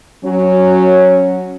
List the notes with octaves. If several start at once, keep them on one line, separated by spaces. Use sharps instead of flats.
F#3 C#4